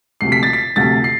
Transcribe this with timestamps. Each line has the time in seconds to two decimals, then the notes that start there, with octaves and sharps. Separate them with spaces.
0.21 D2 C3 F3 C7
0.32 B6
0.43 A6
0.53 B6
0.76 D2 C3 F3 A6
1.04 C7